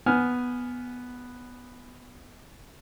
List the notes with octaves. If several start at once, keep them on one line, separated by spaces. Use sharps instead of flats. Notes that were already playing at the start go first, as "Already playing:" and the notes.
B3 G#5 F6